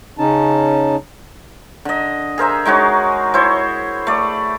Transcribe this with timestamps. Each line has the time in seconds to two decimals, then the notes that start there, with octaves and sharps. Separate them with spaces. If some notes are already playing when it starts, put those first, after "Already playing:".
0.18 C#3 C#4 D#4 A5
1.85 D3 D#5
2.38 G#4 A#4 C5 E5
2.65 G#3 D#4 F#4 C#5
3.34 E4 C5 C#5
4.07 A3 D5